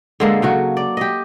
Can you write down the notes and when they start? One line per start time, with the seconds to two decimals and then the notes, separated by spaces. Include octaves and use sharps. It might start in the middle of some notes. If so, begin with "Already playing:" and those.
0.20 D3 G#3 A#3 A4
0.42 C#3 F#3 F#4
0.77 D5
0.97 G4 D#5